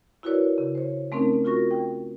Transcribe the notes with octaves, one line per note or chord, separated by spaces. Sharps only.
E4 F#4 A#4 B4 C#5 D5
C#3
C5 C#5
A3 C4 C#4 D#4 A#4
F4 F#4 A#4 C#6 A#6
G5